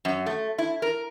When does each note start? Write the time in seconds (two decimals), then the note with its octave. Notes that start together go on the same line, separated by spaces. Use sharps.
0.05 F#2
0.26 A3
0.58 E4
0.82 A#4